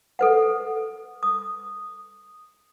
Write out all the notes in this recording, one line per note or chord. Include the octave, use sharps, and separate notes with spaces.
A4 B4 F#5
D#6